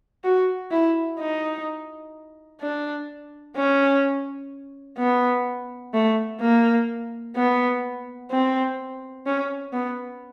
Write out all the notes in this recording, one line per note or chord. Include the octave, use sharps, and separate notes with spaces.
F#4
E4
D#4
D4
C#4
B3
A3
A#3
B3
C4
C#4
B3